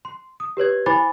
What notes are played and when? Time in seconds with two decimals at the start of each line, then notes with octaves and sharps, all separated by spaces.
0.05 C6
0.40 D#6
0.57 G4 B4 C#5 G#6
0.86 E4 C5 G#5 B5 D6 A6